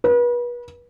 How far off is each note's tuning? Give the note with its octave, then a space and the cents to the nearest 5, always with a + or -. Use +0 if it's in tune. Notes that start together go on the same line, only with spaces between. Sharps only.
B4 -35